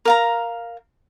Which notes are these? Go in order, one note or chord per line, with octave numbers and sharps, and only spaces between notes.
A#4 F5 A#5